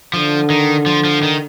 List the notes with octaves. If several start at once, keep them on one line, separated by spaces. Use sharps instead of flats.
D3 F3
D#3
F3
F3
D#3